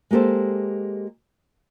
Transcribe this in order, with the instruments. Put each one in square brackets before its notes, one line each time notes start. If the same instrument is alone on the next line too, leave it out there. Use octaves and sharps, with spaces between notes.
[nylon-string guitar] G#3 A#3 G4 A4 C5